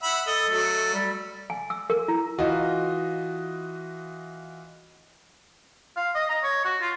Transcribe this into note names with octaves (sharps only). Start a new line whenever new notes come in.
E5 F#5 B5
A4 D#5
F#3 A3
G3
G#5
E6
A#4
E4
E3 F4 F#4 D#5
F5
D#5
A#5
C#5
F#4
F4